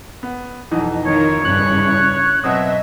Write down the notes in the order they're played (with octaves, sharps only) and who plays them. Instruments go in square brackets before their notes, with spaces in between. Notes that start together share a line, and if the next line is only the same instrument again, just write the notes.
[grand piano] B3
[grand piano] F2 B2 E3 [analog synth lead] D#4
[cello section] D#3 F4 A#4 [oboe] C#5
[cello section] G2 C#3 E4 [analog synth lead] F#6
[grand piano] B2 F#3 C4 [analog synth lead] D#5 [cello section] E5